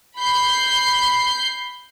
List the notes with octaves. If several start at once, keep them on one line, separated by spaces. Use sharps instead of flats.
B5 G6 C7